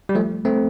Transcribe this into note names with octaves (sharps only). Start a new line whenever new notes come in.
G3
F3 A3
A3 C4